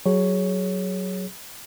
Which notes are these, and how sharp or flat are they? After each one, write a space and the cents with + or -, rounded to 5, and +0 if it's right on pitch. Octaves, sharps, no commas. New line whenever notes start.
F#3 +15 G#4 +0 C#5 +0